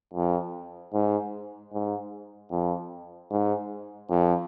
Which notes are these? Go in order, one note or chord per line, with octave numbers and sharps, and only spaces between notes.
F2
G#2
G#2
F2
G#2
F2